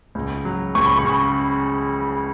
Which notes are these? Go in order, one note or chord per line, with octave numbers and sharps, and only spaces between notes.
C#2
F#3
C#2 C#6
B5
C#6
C#3